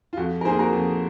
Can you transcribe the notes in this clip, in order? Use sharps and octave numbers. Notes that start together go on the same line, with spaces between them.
F4
F2 F#4
A#4
D#3 A#3 G#4 C5
F#4 A#4
F2